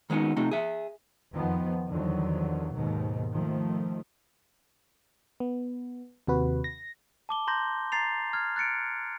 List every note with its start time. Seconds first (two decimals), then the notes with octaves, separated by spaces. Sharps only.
0.10 D#3 G#3 B3 C#4 D#4
0.37 C3 A3 D#4
0.51 G#4 E5
1.33 F2 D#3 F3 B3
1.89 E2 D3 D#3 F3 F#3
2.75 D#2 G#2 B2 D#3
3.33 D#3 F3 A3
5.40 B3
6.27 D#2 C3 F#4 B4
6.64 A#6
7.29 A5 D6 G7
7.47 A#5 C6 G6 A#6
7.92 A#5 A6 C7 F7
8.33 F6 G#6
8.56 F#6 A6 C#7 D7